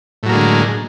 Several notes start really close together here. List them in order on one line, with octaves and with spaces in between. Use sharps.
A2 F#3 A#3 G#3 D3